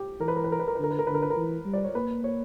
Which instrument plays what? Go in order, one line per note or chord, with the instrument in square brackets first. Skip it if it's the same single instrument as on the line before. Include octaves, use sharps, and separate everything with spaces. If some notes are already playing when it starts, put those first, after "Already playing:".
Already playing: [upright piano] G4
[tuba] E3 [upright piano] A#4
[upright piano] B4
A#4
B4
A#4
B4
A#4
B4
[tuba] D3
[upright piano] A#4
B4
A#4
[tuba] D3 [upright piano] B4
[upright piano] A#4
B4
A#4
[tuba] E3
G3
[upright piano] D5
C#5
[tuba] A#3 [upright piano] B4
[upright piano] C#5